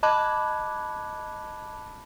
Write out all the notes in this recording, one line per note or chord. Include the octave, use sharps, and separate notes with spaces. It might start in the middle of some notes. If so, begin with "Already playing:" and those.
D#5 A5 B5 D6 F#6 G#6